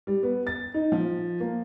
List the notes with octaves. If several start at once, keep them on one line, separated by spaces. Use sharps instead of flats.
G3
B3
A6
D#4
F3
A#3